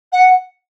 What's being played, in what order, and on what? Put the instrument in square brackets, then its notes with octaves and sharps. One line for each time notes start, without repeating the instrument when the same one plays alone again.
[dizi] F#5